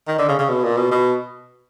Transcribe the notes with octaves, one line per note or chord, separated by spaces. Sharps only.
D#3
D3
C#3
C#3
B2
A#2
B2
B2